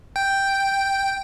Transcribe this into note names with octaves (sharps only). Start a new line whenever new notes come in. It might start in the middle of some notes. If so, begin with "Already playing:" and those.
G5